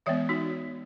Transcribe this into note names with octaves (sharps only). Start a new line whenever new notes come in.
E3 G#3 B3 C#5 E5
D#4 F#4